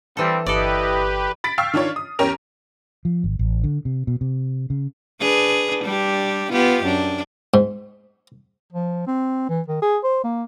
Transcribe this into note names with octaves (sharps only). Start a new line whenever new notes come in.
E3 G3 C4 A4
G1 E4 G4 A4 B4 D5 D#5
B5 A6 B6 D7
F5 G5 C#6 E6 F6 C7
D#3 D4 F4 C#5
D#6
E2 C#4 G4 A#4 F7
F3
G#1
A1
D3
C3
B2
C3
C#3
D4 G#4 B4
G3 D4 G4
B3 F4 G4
F#2 D4
G#2
F3
C4
E3
D#3
G#4
C5
A#3